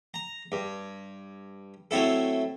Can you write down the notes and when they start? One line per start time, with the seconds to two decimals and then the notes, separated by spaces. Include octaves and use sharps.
0.14 A#5
0.52 G2
1.91 F#3 A3 C4 E4 A4